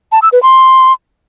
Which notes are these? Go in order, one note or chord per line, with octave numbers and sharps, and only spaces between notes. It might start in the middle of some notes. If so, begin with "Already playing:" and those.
A5
E6
B4
C6